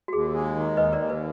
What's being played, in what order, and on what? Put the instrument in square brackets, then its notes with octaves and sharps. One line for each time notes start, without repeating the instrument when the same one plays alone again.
[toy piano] F#4
[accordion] D#2 [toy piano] G#4
[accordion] G#3
D#3
[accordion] D#2 [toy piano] B4 D#5
[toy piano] A#4 D5
[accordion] D#2
[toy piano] B4